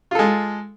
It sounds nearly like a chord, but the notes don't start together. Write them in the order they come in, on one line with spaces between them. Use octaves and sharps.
F4 A4 G#3